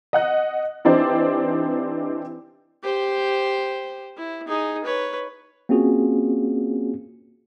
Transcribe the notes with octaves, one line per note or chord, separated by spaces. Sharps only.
D#5 F#5 F#6
E3 C4 D4 D#4 G4 C5
G4 C5
E4
D#4 G#4
B4 C#5
A#3 C4 C#4 F4 F#4 G#4